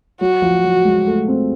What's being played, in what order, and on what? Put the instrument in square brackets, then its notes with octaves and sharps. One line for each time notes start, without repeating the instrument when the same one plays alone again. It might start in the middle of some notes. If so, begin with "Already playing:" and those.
[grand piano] F#3 [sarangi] F#4
[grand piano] F3
F#3
G#3
A3
C4